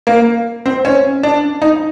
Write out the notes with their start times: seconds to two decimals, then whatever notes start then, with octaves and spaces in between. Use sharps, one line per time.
0.07 A#3
0.66 C4
0.85 C#4
1.23 D4
1.62 D#4